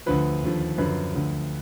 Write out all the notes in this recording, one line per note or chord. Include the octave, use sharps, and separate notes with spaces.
D2 D3 F3 B4
D#2 D3 F3
F#2 D3 F3 B4
D2 D3 F3